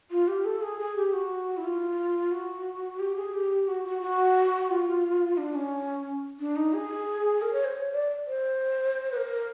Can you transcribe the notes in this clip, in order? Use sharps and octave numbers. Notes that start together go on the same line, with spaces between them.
F4
G4
A4
G#4
G#4
G4
F#4
E4
F4
F#4
G4
G#4
G4
F#4
F#4
F#4
F4
D4
C#4
D4
D#4
G#4
A#4
C#5
C5
C#5
D5
C5
B4
A#4